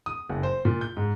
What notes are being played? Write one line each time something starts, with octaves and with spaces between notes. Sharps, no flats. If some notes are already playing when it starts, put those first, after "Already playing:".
D#6
F#1
C5
A#2
G6
G#2